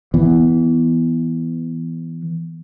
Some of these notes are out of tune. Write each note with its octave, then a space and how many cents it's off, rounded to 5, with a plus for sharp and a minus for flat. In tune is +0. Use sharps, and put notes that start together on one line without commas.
E3 +0 B3 +0